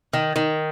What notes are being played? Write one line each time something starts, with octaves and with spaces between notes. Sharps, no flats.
D#3
D#3